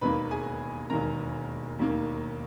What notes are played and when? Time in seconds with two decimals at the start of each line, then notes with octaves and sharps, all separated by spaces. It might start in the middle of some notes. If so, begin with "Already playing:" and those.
0.01 E1 D#2 D#3 A#3 B4 B5
0.31 G#4 G#5
0.90 E1 D#2 D#3 A#3 A#4 A#5
1.78 E1 D#2 D#3 A#3